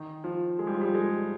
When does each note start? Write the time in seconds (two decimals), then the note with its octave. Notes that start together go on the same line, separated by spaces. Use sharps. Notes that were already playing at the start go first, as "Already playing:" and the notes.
Already playing: D#3
0.24 F3
0.59 G#3
0.67 G3
0.74 F3
0.81 G3
0.95 G#3